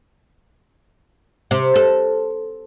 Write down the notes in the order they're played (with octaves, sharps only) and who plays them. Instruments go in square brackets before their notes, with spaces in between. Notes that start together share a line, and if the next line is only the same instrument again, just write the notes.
[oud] C3
A4